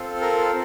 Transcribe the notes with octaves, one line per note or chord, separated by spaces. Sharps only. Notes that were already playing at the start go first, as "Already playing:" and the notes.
Already playing: C4 F4 A4
A#4